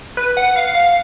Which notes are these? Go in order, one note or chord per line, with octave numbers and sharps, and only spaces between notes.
B4
F#5
F5
F5